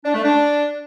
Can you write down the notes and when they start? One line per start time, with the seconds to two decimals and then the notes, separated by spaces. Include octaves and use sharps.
0.05 D4
0.14 A3
0.23 D4